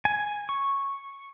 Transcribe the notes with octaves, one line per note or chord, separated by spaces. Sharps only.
G#5
C#6